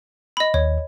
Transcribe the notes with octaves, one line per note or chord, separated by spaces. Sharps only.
D#5 B5
D#2 C#5